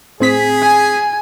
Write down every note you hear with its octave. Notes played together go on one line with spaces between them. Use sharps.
A2 C4 G#4 B6
G#5